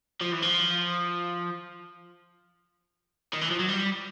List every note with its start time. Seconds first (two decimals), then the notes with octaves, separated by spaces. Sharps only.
0.21 F3
0.33 E3
0.43 F3
3.33 D#3
3.41 E3
3.51 F3
3.59 F#3
3.69 G3